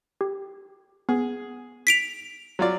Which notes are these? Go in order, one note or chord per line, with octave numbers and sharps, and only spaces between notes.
G4
B3 G#4
B6 D7 F7
F#3 F4 D5